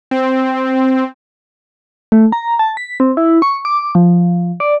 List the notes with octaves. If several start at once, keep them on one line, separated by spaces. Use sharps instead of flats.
C4
A3
A#5
A5
B6
C4
E4
C#6
D6
F3
D5